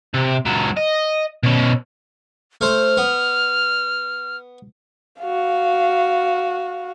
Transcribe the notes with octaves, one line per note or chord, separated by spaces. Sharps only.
C3
C#2 F#3
D#5
B2 C#4
A3 C5 F6
B3
F#4 F5